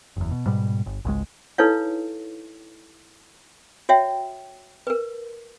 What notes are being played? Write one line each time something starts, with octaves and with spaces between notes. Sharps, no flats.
F#1 E2
B2
G#2 B2 G3
G1
G#1 C#2 G#3
D#4 E4 A4 B4 C#5 F5
F#4 C#5 E5 G5
A#4 B4